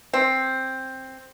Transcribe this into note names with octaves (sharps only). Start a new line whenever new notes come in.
C4